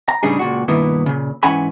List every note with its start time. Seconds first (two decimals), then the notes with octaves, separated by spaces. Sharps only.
0.09 A#5
0.23 A2 C#3 G3 D4 D#4 G#4
0.39 C#2 A#2 F#4
0.68 G2 B2 D#3 A#3 B3 E4
1.06 A#2 C#3
1.43 G#2 E3 C#4 F#5 G#5 B5